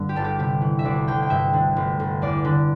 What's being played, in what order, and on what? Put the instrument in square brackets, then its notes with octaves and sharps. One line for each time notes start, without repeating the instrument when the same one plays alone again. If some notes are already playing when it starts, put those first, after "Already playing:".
Already playing: [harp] G2 D3
G4
G1 A4
G4
C3 G4
E3
E5
D2 D5
D2 G5
G5
G2 E5
D3
G1
G1
E2 D5
D3